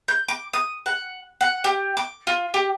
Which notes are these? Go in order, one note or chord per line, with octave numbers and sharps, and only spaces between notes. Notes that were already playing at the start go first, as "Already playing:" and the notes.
G6
D6
D#6
F#5
F#5
G4
D6
F4
G4